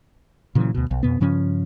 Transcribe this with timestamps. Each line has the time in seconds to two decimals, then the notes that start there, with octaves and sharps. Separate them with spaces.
0.55 A#2 C#3 E3 F#3
0.75 D2 B2
0.91 B1
1.03 F2 B2 B3
1.20 G2 C#3 F3 C#4